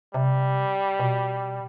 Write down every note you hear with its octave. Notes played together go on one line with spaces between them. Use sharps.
C3 G3
B2